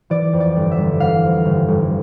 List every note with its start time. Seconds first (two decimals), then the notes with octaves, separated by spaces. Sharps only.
0.10 E3 D5
0.33 F2
0.40 D5
0.56 G1
0.71 E5
0.78 G1
1.00 E3 F5
1.24 F2
1.45 G1
1.68 G1